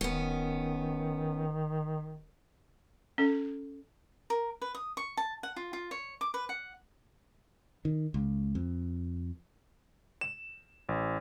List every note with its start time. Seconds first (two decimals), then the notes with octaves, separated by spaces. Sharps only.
0.01 D#1 D#3 B3 C#4
3.18 C#4 A4
4.30 A#4
4.62 B4
4.75 D#6
4.97 C#6
5.17 A5
5.43 F#5
5.56 F4
5.73 F4
5.91 C#5
6.21 D6
6.34 B4
6.49 F#5
7.85 D#3
8.14 C#2
8.55 F2
10.21 E7
10.89 A1